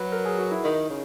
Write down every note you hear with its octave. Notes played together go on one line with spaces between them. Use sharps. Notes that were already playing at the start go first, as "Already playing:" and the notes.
Already playing: F#3 B4
A#4
G#4
F#4
E4
D#3 D#4
C#3